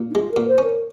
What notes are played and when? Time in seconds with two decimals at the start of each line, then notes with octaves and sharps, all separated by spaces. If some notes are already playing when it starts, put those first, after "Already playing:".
Already playing: A#2
0.10 D#4
0.14 G#3 F4
0.31 A#4
0.36 A#2
0.47 C5
0.58 C#4 A#4